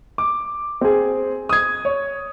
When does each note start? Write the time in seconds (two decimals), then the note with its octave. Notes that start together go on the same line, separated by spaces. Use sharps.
0.18 D6
0.81 C4 G#4
1.49 D#6 G#6
1.85 C#5